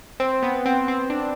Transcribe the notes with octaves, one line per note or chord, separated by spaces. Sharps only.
C4
B3
C4
C4
D4